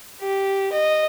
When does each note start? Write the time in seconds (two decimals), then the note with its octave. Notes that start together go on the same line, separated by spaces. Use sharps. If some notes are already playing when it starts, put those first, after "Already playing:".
0.21 G4
0.73 D#5